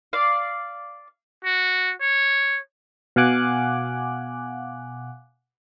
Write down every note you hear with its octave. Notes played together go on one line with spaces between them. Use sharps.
D5 F5
F#4
C#5
B2 F5 F#5 G#5 D6 F#6